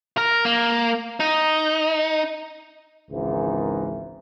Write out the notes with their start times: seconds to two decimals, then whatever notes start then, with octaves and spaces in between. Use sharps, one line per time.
0.17 A#4
0.45 A#3
1.20 D#4
3.10 G#1 C#2 G#2 D#3 E3